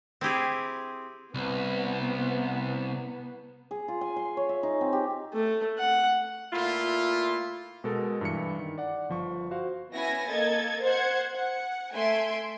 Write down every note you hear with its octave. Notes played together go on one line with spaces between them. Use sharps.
C4 E4 G4 G#4
C2 B3
G#4
F4
G#5
C6
C#5
E5
D#4
C4
G4
A3
F#5
A#2 A3 E4 F4
B2 G#3 A4 A#4
G2 E3 C#7
D#3
D5 F#5
G1 F3 C#6
F#4 C5 F5
B3 C#4 E4 G#5 A#6
A#3 A4 D#5 G#6 A6
C5 F#5 G#6
F#5
A3 E5 G#5 C6 D7